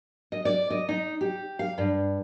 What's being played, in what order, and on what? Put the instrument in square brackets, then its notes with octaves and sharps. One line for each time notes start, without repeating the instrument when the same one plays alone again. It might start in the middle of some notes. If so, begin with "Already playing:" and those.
[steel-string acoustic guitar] D#5
D5
D#5
D#4
G4
F5
G2